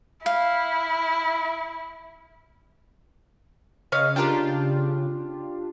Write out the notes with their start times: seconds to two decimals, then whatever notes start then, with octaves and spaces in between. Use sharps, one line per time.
0.26 E4 F5
3.92 C#3 C#5 D#5 F5
4.16 D4 F4 G4 A#4 G5